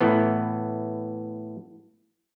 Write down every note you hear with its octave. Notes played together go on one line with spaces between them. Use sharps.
A2 E3 B3